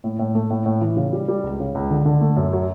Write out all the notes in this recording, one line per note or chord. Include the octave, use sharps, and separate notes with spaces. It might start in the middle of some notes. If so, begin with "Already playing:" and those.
A2
A2
A3
A2
A2
E3
C#3
G3
G3
C#2
C#3
C#2
D3
D3
A3
F#2
F#3